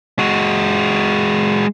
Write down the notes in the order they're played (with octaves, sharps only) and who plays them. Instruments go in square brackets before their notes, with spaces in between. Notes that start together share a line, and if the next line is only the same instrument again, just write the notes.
[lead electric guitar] G#3 F#4